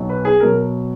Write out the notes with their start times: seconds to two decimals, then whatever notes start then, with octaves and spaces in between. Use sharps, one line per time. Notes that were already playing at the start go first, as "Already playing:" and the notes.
Already playing: B1 B2 F#3
0.09 B4
0.25 G#4
0.40 B2 F#3 A#4